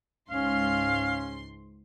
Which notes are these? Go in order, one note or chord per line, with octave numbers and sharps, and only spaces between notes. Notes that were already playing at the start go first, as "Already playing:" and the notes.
C#2 G#2 C#4 F5 C6